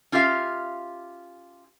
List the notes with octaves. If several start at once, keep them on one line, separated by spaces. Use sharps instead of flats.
C#4 F4 G4 E5 F5